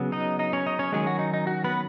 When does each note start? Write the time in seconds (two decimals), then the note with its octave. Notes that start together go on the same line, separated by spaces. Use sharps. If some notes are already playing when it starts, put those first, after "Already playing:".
Already playing: C#3 F#3 B3
0.12 D#4 D#5
0.39 D#4 D#5
0.53 C#4 C#5
0.66 D#4 D#5
0.79 C#4 C#5
0.92 D#3 F#3 G#3 C#4 G#4
1.07 F#4
1.19 D#4
1.34 D#4
1.47 F#4
1.64 B3 B4